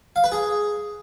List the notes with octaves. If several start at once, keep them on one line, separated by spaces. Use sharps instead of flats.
F5
B4
G#4